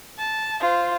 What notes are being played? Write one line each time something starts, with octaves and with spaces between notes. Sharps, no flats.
A5
F4 C5